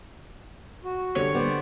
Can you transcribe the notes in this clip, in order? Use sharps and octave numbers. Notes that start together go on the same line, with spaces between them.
F#4
D3 G3 C#5
B3 C5 D5